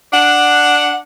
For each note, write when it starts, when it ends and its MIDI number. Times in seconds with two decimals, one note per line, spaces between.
0.13 0.99 62
0.13 0.99 78